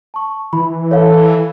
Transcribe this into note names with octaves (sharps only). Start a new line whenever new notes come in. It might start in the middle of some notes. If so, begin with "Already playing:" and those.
A5 C#6
E3 B5
A4 C#5 F5